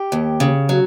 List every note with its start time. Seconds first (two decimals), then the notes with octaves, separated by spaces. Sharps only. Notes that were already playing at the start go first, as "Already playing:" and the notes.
Already playing: G4
0.12 D#2
0.40 C#3
0.69 F#3